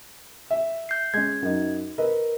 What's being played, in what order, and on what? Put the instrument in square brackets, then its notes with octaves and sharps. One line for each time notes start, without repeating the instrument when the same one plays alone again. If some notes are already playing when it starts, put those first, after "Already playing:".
[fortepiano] E5
[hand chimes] G6 C7
[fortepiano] G#3 C#4 [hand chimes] G#6
[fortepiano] F#2 D#4
[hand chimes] A#4 [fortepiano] B4 D#5